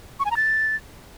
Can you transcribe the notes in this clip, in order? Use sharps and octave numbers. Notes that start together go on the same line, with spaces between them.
C#6
G#5
A#5
A6